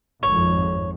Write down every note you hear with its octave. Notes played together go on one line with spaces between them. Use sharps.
G#1 F2 C#5